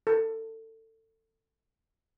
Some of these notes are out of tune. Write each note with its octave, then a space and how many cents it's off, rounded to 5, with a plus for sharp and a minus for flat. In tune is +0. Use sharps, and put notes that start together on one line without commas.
A4 +25